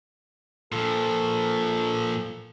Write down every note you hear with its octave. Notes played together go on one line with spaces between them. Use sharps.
A#2 F3 A4